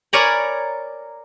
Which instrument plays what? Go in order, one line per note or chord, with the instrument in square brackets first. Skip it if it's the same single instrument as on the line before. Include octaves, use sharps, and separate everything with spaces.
[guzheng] A#4 C#5 D5 G#5 A#5 B5